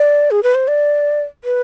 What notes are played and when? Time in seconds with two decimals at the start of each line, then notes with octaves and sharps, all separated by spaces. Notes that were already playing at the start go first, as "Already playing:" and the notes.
Already playing: D5
0.31 G#4
0.43 B4
0.55 C5
0.68 D5
1.44 B4